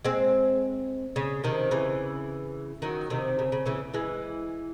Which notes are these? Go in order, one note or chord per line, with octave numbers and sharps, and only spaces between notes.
G#3 C4
C#3
C3 D#3
C#3 E3
D#3 F#3
C3 D#3
C#3
C#3
C#3 E3
E3 G#3